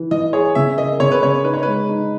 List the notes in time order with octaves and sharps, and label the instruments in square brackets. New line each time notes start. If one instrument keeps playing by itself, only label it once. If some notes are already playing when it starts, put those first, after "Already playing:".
Already playing: [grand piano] E3
[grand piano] E3 [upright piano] D#5
[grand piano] G#4 [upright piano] C#5
[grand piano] C#3 [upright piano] E5
[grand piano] A#3 [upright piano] D#5
[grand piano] C#3 [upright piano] C#5
[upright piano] B4
[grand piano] C#3 [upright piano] C#5
[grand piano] D#4 [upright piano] B4
[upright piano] C#5
[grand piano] G#3 [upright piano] B4
[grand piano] D#4